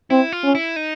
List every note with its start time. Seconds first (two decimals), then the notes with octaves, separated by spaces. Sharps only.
0.10 C4 E4
0.32 F4
0.44 C#4
0.55 E4
0.76 D#4